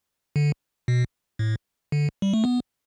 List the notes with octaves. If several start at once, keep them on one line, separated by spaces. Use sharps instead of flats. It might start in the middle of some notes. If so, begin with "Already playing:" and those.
D3
B2
A2
D3
G3
A3
B3